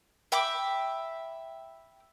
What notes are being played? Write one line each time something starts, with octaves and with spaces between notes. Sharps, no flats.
E5 G5 B5 D6